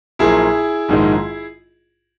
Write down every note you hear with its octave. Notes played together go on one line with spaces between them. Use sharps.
A#1 A#2 F#3 E4 G#4
A#1 G#2 D#3 G#3